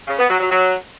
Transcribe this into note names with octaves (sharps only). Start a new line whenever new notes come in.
C#3
B3
F#3
F#3
F#3